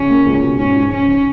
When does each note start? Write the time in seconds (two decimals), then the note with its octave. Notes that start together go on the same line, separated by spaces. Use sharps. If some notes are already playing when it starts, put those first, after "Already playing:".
Already playing: C#3 C#4
0.10 A#3
0.26 C#2
0.43 B2
0.59 G#2 C#4
0.76 G#2
0.92 C#3 C#4
1.08 C#3